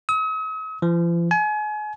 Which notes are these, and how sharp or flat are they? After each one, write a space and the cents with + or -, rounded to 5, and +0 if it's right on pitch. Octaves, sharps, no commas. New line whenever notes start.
D#6 +45
F3 -45
G#5 +35